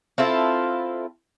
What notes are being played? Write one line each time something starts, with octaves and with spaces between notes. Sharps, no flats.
C4 E4 F4 A4